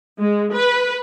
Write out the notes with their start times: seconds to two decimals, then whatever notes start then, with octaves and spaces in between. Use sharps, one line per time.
0.18 G#3
0.52 B4